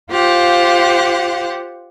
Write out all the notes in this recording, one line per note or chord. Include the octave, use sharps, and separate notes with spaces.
F4 G4 C5 F5 F#5